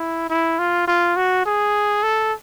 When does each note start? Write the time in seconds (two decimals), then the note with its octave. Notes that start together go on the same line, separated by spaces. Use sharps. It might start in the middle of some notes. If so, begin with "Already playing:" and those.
Already playing: E4
0.30 E4
0.59 F4
0.88 F4
1.16 F#4
1.46 G#4
2.03 A4